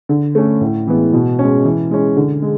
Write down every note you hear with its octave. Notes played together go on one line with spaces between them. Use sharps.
D3
A3 C#4
A2
E3 G#3 B3
B2
G#3 C#4
E3
G#3 C#4
D3
G#3